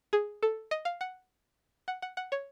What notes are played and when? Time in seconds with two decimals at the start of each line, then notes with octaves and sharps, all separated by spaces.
0.13 G#4
0.43 A4
0.71 D#5
0.85 F5
1.01 F#5
1.88 F#5
2.02 F#5
2.17 F#5
2.32 C#5